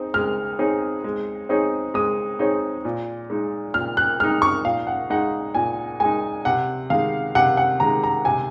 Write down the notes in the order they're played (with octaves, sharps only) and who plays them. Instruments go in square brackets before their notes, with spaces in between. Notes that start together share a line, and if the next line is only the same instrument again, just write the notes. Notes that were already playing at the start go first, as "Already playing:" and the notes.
Already playing: [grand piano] C4 D#4 G#4
[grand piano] G#3 [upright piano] F6
[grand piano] C4 D#4 G#4 C#5
G#3
C4 D#4 G#4 C#5
[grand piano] G#3 [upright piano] D#6
[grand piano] C4 D#4 G#4 C#5
A#2
G#3 D#4
[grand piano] A#2 [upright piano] F6
[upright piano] F#6
[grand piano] G#3 [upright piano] F6
[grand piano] D#4
[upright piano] C#6
[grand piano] A#2 [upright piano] F5
[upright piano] F#5
[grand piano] G#3 D#4 [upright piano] F#5
[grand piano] A#2 [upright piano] G#5
[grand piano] G#3 D#4 [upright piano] G#5
[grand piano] C3 [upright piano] F#5
[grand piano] D#3 G#3 [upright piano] F5
[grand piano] C3 [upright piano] F#5
[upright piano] F#5
[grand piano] D#3 G#3 [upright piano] A#5
[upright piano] A#5
[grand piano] C3 [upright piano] G#5